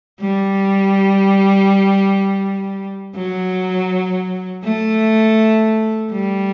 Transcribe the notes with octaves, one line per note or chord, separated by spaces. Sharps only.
G3
F#3
A3
G3